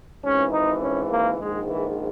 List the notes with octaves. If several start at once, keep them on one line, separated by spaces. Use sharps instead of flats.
G#1 G#2 E3 C#4
D#4
C#4
A#3
A#1 G#2 D#3 G#3
E3